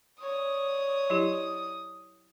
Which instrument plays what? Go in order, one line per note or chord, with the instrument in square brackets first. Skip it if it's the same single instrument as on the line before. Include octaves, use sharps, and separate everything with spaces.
[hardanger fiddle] C#5 D5 [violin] D#6
[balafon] F#3 E4 G4